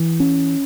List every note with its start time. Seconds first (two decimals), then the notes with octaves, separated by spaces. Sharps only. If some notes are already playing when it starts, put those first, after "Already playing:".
Already playing: E3
0.20 C#4